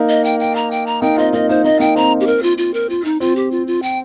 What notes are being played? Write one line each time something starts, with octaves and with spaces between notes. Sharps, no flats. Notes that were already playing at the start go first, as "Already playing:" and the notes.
Already playing: A#3 D#4
D#5
G5
G5
A#5
G5
A#5
A#3 D#4 G5
C4 F4 D#5
A#3 D#4 D#5
A#3 D#4 C5
A#3 D#4 D#5
A#3 D#4 G5
C4 A#5
G4
A#4
F4
F4
A#4
F4
D#4
C4 F4
G4
F4
F4
G5